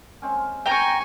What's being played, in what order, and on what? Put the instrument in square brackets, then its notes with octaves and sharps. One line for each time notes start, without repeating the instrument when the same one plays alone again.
[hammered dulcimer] G#3 C4 C#4
[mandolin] G5 A#5 [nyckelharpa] G#5 C#6